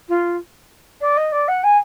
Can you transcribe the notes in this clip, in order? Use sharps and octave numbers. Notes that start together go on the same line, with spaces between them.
F4
D5
D#5
D5
F#5
G#5